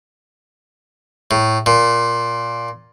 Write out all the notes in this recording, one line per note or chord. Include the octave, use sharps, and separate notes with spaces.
A2
A#2